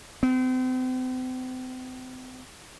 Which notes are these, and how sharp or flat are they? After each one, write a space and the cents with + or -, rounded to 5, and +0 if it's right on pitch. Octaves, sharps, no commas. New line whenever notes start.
C4 -40